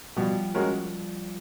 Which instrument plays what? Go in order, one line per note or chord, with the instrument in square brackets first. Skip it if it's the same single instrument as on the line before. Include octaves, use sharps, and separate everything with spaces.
[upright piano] B2 [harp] F3 G3
[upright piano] G#3 C#4 F#4 A#4